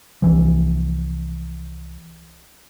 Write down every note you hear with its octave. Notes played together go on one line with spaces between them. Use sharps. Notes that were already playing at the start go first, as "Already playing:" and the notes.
C2 E3 F3